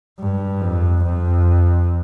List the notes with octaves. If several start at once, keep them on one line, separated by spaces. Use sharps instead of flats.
G2
F2
F2